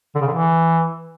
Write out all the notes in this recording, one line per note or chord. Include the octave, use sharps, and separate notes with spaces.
D3
C#3
D3
E3